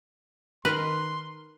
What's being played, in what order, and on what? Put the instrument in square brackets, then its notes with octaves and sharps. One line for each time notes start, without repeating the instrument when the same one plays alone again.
[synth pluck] D#3 A#4 F6 [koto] B4 [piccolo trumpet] C6